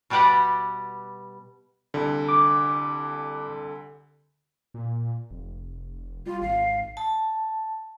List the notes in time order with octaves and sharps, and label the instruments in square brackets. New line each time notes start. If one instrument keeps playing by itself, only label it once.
[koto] B2 G3 G4 B4 D5 F#5
[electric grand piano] C2 D3
[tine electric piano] D6
[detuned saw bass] A#2
F1
[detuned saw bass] G3 [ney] F4
[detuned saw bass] G#1 [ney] F5
[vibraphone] A5